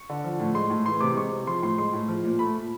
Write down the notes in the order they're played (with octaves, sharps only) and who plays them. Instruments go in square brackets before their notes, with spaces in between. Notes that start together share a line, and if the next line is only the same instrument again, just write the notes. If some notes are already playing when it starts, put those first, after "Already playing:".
Already playing: [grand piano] C#6
D3
F3
A2
G#3 C6
A2
E3 C6
C3 D6
G#3 C#6
C3
F3 C6
A2 C6
G#3 C6
A2
F3
A#2
A3 B5
A#2